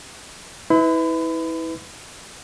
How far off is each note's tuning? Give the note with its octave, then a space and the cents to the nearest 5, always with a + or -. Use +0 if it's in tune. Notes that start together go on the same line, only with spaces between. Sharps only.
E4 -30 B4 +15 B5 +35